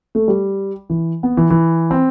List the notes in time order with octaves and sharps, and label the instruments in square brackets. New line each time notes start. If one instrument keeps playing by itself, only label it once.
[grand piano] A3
G3
E3
B3
E3
E3
C4